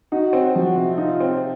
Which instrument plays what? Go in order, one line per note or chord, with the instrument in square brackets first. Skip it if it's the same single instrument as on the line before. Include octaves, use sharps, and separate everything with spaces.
[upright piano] D#4 [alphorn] F#4
[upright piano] C4
[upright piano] F3 [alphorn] F#4
[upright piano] C3
[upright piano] D#4 [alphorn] F4
[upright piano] C4